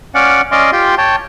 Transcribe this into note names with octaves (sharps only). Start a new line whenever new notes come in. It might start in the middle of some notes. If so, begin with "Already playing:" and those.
C#4 D5 F5 F#5
C#4 D5 D#5 F5 C6
F4 G4 G5 C6
C#5 G5 A5